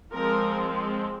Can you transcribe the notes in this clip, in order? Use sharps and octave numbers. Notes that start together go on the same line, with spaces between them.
F3 G#3 C4 A#4